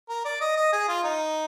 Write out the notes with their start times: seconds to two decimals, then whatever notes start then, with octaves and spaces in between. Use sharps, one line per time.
0.09 A#4
0.25 D5
0.41 D#5
0.56 D#5
0.73 G#4
0.88 F4
1.04 D#4